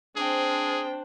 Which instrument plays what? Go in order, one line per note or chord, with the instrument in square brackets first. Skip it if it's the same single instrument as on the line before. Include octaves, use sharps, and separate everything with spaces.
[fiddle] C4 G5 [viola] D4 C5 [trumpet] G#4